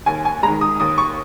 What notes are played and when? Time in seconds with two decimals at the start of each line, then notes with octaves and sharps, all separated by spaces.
0.06 D#2 G#5
0.25 G#5
0.43 G#3 A#5
0.48 D#3
0.61 D#6
0.80 D#2 D#6
0.98 C#6